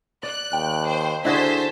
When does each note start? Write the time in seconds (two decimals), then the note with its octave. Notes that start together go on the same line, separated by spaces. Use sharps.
0.23 D5 F#6
0.53 D#2 G5
0.85 C5
1.25 D3 D4 E4 F#4 G#4 C5 A5 B6